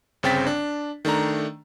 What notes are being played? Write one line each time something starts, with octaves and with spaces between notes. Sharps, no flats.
G1 C#3 C4 G5 A6 B6
D4
D#3 A3 D4 A#5